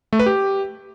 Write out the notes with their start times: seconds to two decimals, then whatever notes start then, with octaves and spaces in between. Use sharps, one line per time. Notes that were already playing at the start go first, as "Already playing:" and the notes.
0.13 A3
0.19 B4
0.26 G4